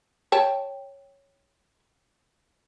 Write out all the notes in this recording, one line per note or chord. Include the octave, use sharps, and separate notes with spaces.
C#5 G5 A5